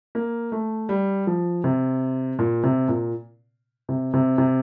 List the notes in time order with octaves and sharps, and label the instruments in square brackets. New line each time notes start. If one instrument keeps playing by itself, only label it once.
[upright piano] A#3
A3
G3
F3
C3
A#2
C3
A#2
C3
C3
C3